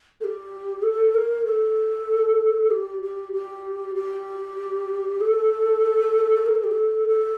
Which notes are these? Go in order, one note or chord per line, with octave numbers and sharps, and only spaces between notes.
A4
G4
A4
A#4
A4
G4
G4
G4
G4
A4
A#4
A4
G4
A4
A4